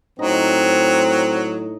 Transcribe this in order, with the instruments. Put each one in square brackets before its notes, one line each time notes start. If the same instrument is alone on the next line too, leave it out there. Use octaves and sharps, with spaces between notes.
[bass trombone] A2 [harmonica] F#3 [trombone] C4 [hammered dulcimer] D#4